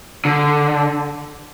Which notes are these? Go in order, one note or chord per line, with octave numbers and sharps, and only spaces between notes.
D3